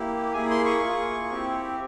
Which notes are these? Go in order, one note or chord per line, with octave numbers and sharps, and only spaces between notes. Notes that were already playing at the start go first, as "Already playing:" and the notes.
Already playing: A#3 E4 G4
A#3 E4 G#4 G#5
C6
C#6
A#3 F4 G#4
C4 E4 G4